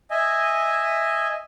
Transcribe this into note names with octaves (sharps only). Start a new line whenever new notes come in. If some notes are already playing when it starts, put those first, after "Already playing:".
D#5 E5 G#5